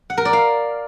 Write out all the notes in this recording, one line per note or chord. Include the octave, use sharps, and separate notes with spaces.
F#5
A#4
D5
F5